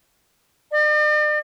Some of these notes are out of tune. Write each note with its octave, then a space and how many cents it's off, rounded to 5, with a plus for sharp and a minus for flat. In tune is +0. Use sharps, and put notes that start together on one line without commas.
D5 +45